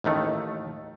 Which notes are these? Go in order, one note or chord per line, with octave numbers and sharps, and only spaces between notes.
A1 D#2 D#3 A3